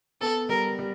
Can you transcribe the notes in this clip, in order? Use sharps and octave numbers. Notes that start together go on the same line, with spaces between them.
B3 A4
G3 A#4
G3